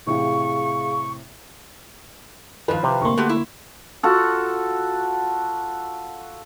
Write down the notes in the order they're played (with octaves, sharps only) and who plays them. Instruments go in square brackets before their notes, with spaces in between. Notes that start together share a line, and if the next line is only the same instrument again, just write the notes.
[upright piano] A2 C3 E3 [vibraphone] G#4 F5 [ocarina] C#6
[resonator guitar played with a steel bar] D#3 F3 [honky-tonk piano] B4 F5
[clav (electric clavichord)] C3 C4
[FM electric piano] D3 A#3 [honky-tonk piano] C6 C#6
[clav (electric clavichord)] A3 [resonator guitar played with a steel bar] B3 F#4 G4
[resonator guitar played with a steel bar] E4
[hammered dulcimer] F4 F#4 A4